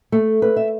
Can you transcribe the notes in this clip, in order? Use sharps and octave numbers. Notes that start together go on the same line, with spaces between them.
A3
B4
E5